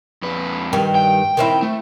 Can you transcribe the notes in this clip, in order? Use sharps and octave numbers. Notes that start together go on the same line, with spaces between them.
F2 B4
G2 D#3
G5
D#3 C4 E4
A3